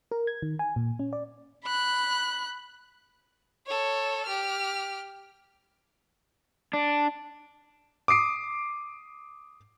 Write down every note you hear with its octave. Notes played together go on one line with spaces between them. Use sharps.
A#4
G#6
D#3
G#5
A#2
C#4
D5
B5 F#6
A4 C#5
G4 F6
D4
D6 D#6 C7 D7